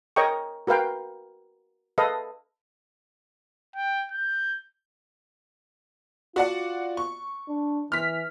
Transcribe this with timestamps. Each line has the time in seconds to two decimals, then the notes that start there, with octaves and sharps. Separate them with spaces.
0.16 A#4 C#5 D#5 G5 A#5 C#6
0.67 F#4 A#4 B4 F5 G5
1.98 A4 B4 D#5 F5
3.76 G5
4.12 G6
6.36 F4 F#4 D5 F#5
6.97 C#6
7.49 D4
7.92 E3 F6 B6